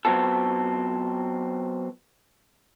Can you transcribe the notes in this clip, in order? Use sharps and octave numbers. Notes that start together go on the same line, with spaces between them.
F#3 B3 C4 F4 A4